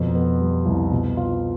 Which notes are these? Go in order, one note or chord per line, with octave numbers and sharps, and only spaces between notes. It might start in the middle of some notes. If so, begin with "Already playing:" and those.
Already playing: F2 B2
B3
G3
C2
B2
F4